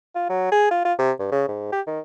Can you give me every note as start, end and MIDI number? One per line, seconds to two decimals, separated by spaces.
0.15 0.25 65
0.29 0.51 54
0.52 0.70 68
0.71 0.84 65
0.85 0.93 65
0.99 1.12 48
1.19 1.32 43
1.32 1.44 49
1.48 1.69 44
1.72 1.81 67
1.87 2.00 51